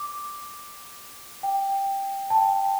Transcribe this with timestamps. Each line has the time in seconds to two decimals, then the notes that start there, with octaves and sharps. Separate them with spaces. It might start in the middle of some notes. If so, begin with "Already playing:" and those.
Already playing: D6
1.43 G5
2.30 A5
2.37 G5